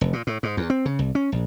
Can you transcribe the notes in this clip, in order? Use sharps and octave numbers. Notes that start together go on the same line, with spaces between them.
F1
A#2
A2
G#2
E2
C4
C#3
C2
C#4
A#1